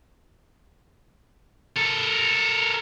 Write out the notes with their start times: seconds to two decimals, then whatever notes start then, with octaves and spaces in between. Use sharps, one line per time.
1.76 A4 A#4